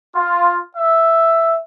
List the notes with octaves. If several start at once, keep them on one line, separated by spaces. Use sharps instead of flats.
F4
E5